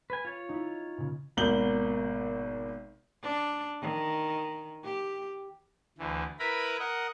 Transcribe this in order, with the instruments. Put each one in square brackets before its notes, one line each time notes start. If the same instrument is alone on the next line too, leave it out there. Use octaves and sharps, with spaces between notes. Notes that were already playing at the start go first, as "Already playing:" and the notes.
[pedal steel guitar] B4 G#5
F4 C#5
[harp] D#4 E4
A#2 C#3
[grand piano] G#1 B2 A#3 G6 F#7 G7
[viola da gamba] D4
D#3
G4
[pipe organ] D2 E3
E4 A#4 B4 A#5 B5
A#4 D#5 F#5